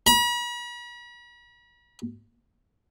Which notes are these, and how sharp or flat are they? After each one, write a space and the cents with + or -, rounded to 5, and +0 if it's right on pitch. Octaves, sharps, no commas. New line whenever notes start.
B5 -45